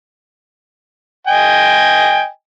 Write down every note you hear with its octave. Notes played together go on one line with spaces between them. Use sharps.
D#5 G5 G#5